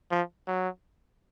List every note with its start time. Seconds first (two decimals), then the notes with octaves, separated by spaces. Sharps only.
0.11 F3
0.47 F#3